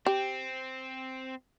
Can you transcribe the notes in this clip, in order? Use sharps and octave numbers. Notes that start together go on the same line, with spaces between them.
C4 G4